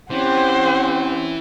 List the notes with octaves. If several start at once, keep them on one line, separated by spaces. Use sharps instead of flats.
E3 C4 C#4 G4 C5 F#5